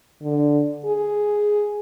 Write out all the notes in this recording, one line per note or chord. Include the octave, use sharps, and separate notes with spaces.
D3
G#4